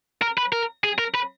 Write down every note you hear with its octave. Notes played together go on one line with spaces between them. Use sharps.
A#4
B4
A#4
G#4
A#4
B4